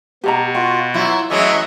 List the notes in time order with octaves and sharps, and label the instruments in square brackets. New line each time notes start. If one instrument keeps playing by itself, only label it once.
[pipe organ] B2 [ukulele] G4 A5 A#5
[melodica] F4 F#4 [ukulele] G5
[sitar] F#3 E4 [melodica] F4
[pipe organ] E3 F#3 [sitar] G#3 A3 C#4 [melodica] D#5 E5 C#6